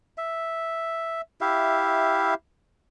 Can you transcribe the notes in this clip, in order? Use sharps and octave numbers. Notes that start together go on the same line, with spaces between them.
E5
E4 G4 E5 F5